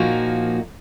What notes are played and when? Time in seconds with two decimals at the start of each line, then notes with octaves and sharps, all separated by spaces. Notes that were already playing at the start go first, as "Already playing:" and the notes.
Already playing: A#2 F3 A#3 D#4 F#4